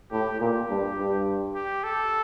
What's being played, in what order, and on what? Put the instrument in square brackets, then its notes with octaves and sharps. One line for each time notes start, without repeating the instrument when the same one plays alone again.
[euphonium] A2 [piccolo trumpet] G4
[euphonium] A#2 [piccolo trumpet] G4
[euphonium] G2
G2
[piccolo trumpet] G4
A4